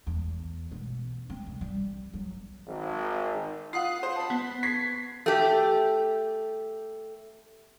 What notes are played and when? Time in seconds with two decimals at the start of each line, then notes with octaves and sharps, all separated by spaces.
0.07 E2
0.71 B2
1.30 C4
1.47 C2
1.61 G3
2.14 F#3
2.66 G#1
3.73 F4 F#5 D#6 C7
4.03 C5
4.16 A5 B5
4.30 B3
4.63 C#6 G#6 B6 C7
5.26 A3 G4